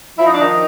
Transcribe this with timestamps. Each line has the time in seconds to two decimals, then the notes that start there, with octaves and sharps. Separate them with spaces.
0.17 F3 E4
0.24 D#4
0.32 D4
0.40 D#3 D#4